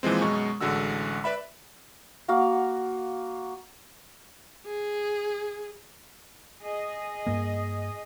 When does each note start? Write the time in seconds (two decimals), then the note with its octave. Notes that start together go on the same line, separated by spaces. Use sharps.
0.03 A#2 E3 F3 G#3 C4
0.22 F#2 B2 G#3 C#6
0.61 A1 D3 G#3 F#4 E6
1.24 B4 D5 E5 B5
2.28 A#3 F#4 F5 F#5
4.67 G#4
6.60 G#4 D#5
7.27 G2 A#3